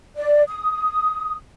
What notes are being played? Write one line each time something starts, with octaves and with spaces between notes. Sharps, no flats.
D5
D#6